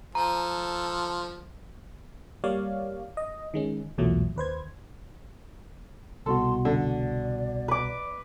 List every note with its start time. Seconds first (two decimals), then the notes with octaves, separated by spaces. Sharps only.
0.15 F3 A4 A#5
2.44 G3 A#3 C#5 D5 F5
3.17 D#5
3.54 D#3 G#3 C#4
3.98 B1 E2 A#2 F#3 A3
4.36 D#2 B4 C5 G#6
6.26 C2 B2 F#4 A4 C6
6.65 D3 D5
7.68 B4 D6